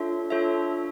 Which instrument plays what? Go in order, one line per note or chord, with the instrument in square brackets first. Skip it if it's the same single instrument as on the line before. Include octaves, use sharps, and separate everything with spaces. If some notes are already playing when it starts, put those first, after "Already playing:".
Already playing: [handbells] D4 F4 A4 C#5 E5
D4 F4 A4 C#5 E5